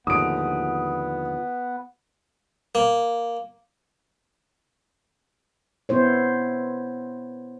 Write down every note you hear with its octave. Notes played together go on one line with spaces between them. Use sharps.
D#2 A2 D3 F3 G#3 B3 D#6 D7
A#3
B3 E4 C5 C#5